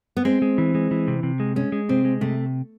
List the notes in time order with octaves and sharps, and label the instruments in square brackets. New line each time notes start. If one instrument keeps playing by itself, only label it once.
[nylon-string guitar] B3
[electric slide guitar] G#3 [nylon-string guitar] C4
[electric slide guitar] G#3
E3
G#3
E3
C3
C3
G#3
[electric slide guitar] G#3 [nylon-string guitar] C#4
[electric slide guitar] G#3
[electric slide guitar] C3 [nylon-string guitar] C4
[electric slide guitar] G#3
[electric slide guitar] C3 [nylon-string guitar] A3